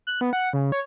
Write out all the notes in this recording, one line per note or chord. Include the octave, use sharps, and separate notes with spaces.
F#6
B3
F#5
C#3
C#5